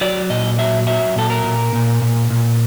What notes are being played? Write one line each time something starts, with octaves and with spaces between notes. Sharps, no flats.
F#3 D5
A#2 D#5
F#3 E5
F#3 E5
A#2 A4
A#4
A#2
A#2
A#2
A#2